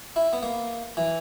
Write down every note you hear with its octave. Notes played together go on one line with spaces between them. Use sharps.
E4
B3
A#3
E3